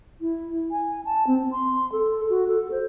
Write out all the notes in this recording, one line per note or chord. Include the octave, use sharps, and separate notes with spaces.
E4
G#5
A5
C4
C6
A4
F#4
A4
C5